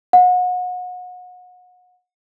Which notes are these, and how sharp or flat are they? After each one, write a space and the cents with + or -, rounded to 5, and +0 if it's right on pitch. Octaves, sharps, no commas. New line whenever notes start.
F#5 -35